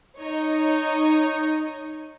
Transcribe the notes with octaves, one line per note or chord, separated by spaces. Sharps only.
D#4 C#5 D#5